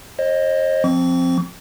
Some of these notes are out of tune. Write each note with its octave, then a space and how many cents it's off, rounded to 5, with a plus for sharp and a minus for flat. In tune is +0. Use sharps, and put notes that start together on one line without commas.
C5 +40 D#5 +0
F3 +0 C4 +0 C#6 +45